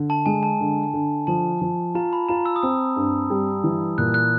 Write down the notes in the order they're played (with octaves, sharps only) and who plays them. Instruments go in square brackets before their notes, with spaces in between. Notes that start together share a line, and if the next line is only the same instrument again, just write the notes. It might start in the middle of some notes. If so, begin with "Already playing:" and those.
Already playing: [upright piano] D3
[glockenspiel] A5
[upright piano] G#3 [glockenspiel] G#5
[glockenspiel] A5
[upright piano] D3
D3
[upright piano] F3 [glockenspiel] A5
[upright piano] F3
[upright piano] F4 [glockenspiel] A#5
[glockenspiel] B5
[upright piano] F4 [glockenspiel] A#5
[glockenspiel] E6
D#6
[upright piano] C4 [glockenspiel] E6
[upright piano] G2
G3
E3
[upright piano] A#2 [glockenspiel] F#6
[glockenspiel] F#6